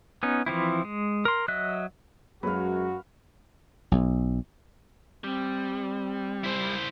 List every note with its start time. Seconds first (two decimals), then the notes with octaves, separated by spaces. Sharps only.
0.23 B3 C#4 D#4
0.46 E3 F3 C4 E4
0.85 G#3
1.25 A#4 C6
1.48 F#3 D#5 E5 F#6
2.43 F#2 F#3 G#3 F#4 B4 F5
3.92 B1
5.24 G3 C4
6.44 E4 C5